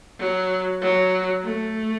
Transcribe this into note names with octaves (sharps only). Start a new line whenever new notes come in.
F#3
F#3
A3